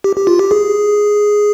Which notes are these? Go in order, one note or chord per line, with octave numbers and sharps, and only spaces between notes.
G4
G4
F4
G4
G#4